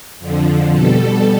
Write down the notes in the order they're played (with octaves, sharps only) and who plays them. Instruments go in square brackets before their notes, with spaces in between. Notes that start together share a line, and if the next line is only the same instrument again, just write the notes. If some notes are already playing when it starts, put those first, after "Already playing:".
[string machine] F2 D3 F3
B2 G3 A4